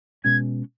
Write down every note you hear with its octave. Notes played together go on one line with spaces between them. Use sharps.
B2 G#3 C#4 G#6